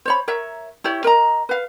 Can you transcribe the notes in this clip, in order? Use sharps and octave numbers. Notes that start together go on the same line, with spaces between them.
C5 C#5 B5
A#4 C#5 E5
E4 G4 C#5
A#4 D#5 A#5
B4 F5